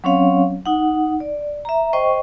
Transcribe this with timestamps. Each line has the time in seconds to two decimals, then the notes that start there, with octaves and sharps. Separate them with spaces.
0.04 F#3 C4 C#4 C#5 F5
0.66 D#4 F#5
1.20 D5
1.65 E5 A#5
1.93 C5 D#5 G5 C#6